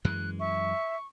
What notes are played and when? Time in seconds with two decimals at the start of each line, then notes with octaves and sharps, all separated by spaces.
0.05 F#2 E3 G#3 F#6
0.40 E5 C#6